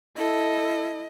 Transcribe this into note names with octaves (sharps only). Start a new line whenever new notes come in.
E4 A4 D#5